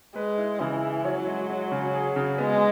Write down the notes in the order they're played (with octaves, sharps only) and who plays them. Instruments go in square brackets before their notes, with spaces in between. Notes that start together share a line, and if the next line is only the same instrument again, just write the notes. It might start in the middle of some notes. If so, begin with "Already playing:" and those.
[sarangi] G#3 [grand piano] B4
[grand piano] E4
[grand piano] C#3 [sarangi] E3
[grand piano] E4
[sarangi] F#3 [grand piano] C#5
[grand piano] G#3
G#3
C#3
G#4
C#3
[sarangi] G#3 [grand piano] B3